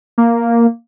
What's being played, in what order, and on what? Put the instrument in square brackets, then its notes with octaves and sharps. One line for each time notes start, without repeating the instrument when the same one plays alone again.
[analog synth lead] A#3